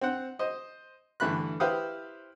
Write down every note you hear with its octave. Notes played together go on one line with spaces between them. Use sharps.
C4 C5 F#5
C5 D#5
G2 D3 E3 A3 B5 F#6
E4 G4 B4 C5 F5 D#6